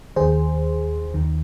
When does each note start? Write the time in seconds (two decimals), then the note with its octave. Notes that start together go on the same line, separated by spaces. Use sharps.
0.16 D#2 D#3 G#4 C5
1.14 D#2 D#3